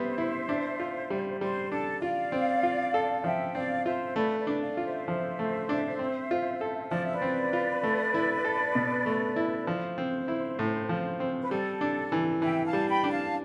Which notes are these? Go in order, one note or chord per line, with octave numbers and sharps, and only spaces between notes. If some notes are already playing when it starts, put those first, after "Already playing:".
Already playing: G3 B3 C5 E5
E4
D4
F4
G3
G3 C5
D4 A4
F4 D5 F5
C4
F4
A4
F3 E5 G5
C4 D5 F5
F4 C5 E5
A3 B4 D5
B4 D5
D4
D5 F5
F4 D5
C5 E5
F3
A3
D4
C4
F4
A4
F3 D5
E5
B4 D5
C4
F4
A3
E4
A4
B2
A3
E4
F3 C5
C4
E4
A2
F3
C4
B4
G3 A4
D4
E3
E3 E5 G5
F5 A5
G3
G5 B5
D4
F5 A5